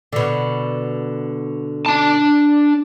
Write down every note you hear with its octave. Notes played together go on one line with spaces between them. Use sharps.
B2 D3
D4 A5